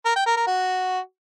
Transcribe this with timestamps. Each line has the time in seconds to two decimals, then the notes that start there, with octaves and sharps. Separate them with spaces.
0.05 A#4
0.16 G5
0.26 A#4
0.37 A#4
0.47 F#4